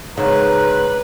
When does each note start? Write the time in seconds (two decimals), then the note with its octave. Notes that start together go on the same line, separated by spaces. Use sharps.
0.17 G#2 C#3 B4 A#5